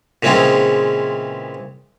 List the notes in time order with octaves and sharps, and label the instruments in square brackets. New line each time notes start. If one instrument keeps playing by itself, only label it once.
[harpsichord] A#2 C#3 E3 G#3 C4 C#4